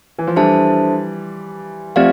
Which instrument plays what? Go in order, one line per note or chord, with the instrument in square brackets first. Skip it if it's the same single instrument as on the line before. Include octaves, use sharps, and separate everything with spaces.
[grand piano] E3
F3
[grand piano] E3 G3 [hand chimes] D4 A4 C5 E5 A5
[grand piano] F3 A3 [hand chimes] C4 G4 D5 F5